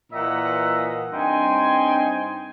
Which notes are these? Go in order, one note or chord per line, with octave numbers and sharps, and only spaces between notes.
A#2 E3 D#5 E5 F#5 A#5
G2 C4 D#4 G5 G#5 C6